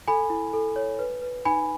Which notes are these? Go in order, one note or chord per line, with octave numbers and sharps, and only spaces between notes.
A4 G#5 B5
E4
A4
C#5
B4
B4
D#4 G#5 B5